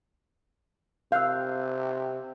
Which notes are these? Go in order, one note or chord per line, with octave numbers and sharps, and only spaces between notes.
C3 F5 E6 F#6 G6